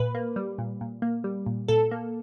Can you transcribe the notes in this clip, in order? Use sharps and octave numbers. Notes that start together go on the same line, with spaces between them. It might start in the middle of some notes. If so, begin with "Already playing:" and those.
Already playing: A#2 B4
A#3
G3
A#2
A#2
A#3
G3
A#2
A#2 A4
A#3